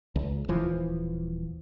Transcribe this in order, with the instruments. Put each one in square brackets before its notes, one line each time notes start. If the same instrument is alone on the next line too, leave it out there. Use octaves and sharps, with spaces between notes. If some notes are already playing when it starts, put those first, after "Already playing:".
[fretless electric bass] C#2
D#1 E3 F3